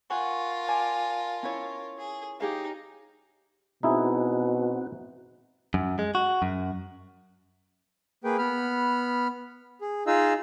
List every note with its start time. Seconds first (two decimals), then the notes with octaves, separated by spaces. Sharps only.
0.10 F4 A#4 F#5 G#5 C#6
0.68 D5 G#5 A5
1.43 C#4 E4 C#5
1.97 G#4
2.40 D#4 G4 G#4 F5
3.83 B2 C4 D#4 E4 F#4 G#4
5.74 F#2
5.99 G#3
6.15 F#4
6.42 F#2
8.24 A#3 G#4 B4 G5
8.38 B3 B5 F6
9.81 G#4
10.07 D#4 F4 G#4 D#5 F5 E6